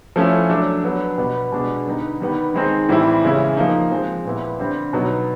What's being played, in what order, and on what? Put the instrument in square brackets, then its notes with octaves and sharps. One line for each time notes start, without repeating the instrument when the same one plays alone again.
[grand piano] F3 A3 C#4 E4
F#3 A3 D4
F#3 B3 D4
B2 G3 B3
B2 G#3 B3 D4
D3 G3 B3 D#4
D#3 G3 B3
D#3 G#3 C4 D#4
A2 E3 G3 C4 E4
C#3 E3 G#3 C#4 E4
F3 A#3 D#4
F3 G#3 C4
A#2 G3 B3 E4
D3 G3 C4
B2 F#3 B3 D#4